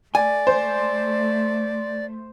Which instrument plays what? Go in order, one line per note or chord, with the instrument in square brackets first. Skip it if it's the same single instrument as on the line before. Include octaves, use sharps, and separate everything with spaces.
[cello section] A3 [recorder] D5 [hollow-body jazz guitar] G#5
[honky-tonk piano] C5